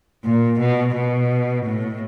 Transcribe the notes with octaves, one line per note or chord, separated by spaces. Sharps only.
A#2
B2
B2
A2